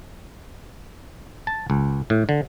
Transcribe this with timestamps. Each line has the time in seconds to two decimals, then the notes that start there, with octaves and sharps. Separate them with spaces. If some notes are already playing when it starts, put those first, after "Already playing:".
1.47 A5
1.70 C#2
2.10 A2
2.29 D3